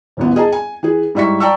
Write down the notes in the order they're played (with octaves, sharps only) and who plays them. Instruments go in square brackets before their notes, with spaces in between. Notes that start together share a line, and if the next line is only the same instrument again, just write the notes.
[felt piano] D#1 A1 B3
G#4 D#5 G#5 A5
G#5
E3 G#4
G#2 G3 E4 E5 C#6 B6
D5 G5 A5 A#5 C#6 E6